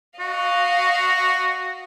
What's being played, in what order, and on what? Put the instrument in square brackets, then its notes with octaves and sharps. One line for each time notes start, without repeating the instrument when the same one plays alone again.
[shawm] F#4 [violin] D#5 F5